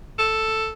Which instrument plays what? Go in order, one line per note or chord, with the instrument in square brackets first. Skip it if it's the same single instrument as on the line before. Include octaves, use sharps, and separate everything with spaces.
[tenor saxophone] A4